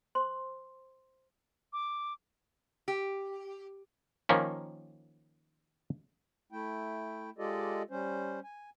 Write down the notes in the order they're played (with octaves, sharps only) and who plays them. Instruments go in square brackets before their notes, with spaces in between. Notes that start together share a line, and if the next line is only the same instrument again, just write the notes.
[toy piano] C5 C6
[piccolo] D6
[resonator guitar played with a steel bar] G4
[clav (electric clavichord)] D#3 F3 A#3 C#4
[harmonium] A3 E4 G5
G#3 F4 G4 A4 D5 D#5
G3 C#4 C5
G#5